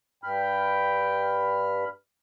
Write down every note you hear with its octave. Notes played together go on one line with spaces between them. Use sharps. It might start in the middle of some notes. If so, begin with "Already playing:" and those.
G2 G5 B5 F6